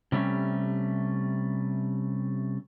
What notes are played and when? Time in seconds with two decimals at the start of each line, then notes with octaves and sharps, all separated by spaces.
0.12 C3 G3 A3 C#4